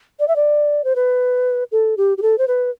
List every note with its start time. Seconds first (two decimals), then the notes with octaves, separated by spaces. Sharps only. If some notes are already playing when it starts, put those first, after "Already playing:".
0.20 D5
0.28 E5
0.36 D5
0.84 C5
0.96 B4
1.72 A4
1.97 G4
2.18 G4
2.22 A4
2.38 C5
2.48 B4